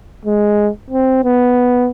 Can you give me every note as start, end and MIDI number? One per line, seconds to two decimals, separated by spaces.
0.25 0.69 56
0.90 1.20 60
1.24 1.89 59